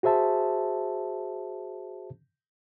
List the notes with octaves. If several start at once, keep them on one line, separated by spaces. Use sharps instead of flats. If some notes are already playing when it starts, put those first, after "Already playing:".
F#4 G#4 C5 E5 A5